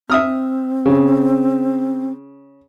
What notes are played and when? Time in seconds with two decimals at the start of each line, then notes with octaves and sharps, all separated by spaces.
0.10 C4 E5 D#6 F6
0.86 C#3